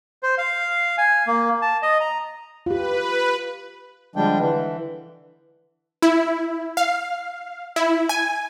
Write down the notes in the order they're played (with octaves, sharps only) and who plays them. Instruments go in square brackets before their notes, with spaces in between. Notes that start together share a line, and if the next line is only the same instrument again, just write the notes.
[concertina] C5
F5
G#5
A#3
A5
D#5
A#5
[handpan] F4 G4 [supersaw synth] B4
[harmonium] D3 F3 G3 G#3 D4 G5
D3 E3
[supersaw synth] E4
F5
E4
G#5